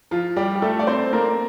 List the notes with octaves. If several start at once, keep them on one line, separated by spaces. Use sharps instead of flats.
F3 F4
G3 G4
G4
A3 A4
D5
C4 C5
A#3 A#4